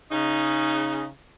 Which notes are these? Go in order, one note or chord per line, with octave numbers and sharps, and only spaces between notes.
C#3 D#4